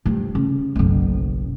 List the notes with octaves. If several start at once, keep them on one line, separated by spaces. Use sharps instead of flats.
G2 F3
C#3
F#1 B1